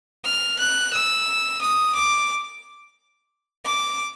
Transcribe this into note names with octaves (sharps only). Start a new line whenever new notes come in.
F6
F#6
E6
D#6
D6
D6